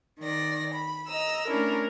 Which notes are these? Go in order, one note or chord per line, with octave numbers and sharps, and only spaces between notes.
D#3 D5 A#6
B5
D#5 A#5 E6
A3 C#4 D4 E4 A#4